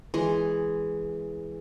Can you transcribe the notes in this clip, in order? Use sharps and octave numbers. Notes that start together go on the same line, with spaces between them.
E3 G#3